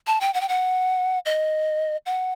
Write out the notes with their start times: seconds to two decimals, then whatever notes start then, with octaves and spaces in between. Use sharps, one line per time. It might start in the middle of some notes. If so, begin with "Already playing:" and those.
0.07 A5
0.21 G5
0.34 F#5
0.41 G5
0.49 F#5
1.26 D#5
2.06 F#5